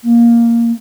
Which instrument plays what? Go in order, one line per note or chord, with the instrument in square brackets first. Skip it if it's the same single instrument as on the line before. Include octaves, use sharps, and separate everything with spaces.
[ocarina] A#3